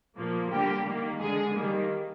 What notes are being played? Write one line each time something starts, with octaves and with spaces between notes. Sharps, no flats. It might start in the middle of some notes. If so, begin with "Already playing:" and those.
A#2 F3 A#3
D3 G3 A#3 G4
D#3 A#3
D3 G#3 G#4
D#3 G3 A#3